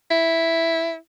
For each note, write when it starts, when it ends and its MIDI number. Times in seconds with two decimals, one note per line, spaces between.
0.11 0.96 64